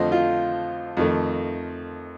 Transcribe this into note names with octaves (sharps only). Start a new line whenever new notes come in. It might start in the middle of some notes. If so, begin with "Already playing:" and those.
Already playing: F2 D3 F3 A3 C5 D#5
F4
F2 D#3 A3